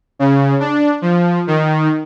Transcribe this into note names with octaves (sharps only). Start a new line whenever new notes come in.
C#3
D4
F3
D#3